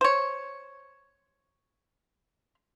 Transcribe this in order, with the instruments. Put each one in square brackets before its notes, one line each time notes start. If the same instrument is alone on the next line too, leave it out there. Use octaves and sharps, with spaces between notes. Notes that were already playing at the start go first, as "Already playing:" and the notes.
[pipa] C5 C#5